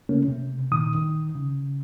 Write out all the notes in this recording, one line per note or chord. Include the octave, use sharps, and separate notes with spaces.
C#3 A3 A#3 C#4
C3
A#2 D#3 D#6
D#3
C#3